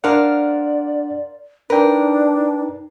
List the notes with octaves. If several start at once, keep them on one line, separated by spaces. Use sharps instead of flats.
D4 A#4 C5 D5 F5 F#5
D4 D#4 A#4 B4 G5